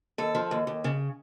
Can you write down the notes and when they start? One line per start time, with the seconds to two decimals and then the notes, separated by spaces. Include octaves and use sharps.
0.18 D#2 A4
0.35 F3
0.51 D#2
0.67 D#2
0.84 C#3